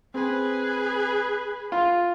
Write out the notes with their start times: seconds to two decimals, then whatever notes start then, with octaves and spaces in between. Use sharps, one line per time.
0.14 C4 G#4 B4
1.72 F4